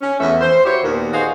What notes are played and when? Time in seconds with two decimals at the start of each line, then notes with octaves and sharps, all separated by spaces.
0.02 C#4
0.19 E2 E3 A3 C#4 E5
0.41 C5
0.65 E4 F#4 G4 C5 C#5
0.83 D#2 A#2 B3 A#4
1.14 F#4 G#4 C5 D#5 F5